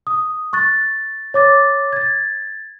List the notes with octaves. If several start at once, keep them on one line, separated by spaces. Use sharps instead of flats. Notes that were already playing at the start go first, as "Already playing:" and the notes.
D#6
C#6 F#6 A6
C#5 D6 A6
G#6 A6